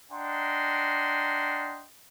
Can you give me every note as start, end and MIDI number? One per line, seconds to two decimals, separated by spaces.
0.12 1.86 62
0.12 1.86 75
0.12 1.86 78
0.12 1.86 79
0.12 1.86 82
0.12 1.86 84